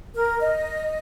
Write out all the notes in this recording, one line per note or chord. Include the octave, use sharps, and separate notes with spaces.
A#4
D#5